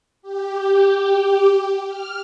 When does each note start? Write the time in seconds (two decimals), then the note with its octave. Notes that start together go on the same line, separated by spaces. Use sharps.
0.22 G4
1.87 F6